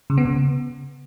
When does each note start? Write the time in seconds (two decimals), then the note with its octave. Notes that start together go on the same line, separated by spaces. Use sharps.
0.10 C#3
0.18 B3
0.25 C#3